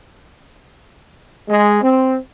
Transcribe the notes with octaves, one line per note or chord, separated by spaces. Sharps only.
G#3
C4